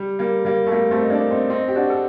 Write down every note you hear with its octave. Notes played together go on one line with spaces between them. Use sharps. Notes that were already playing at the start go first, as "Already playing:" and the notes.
Already playing: G3
G3 A#3
G3 A#3
A3
G3 A#3
A3 C4
D#4
A#3 D4
C4 D#4
C4 D#4
G4
D4 F#4
A4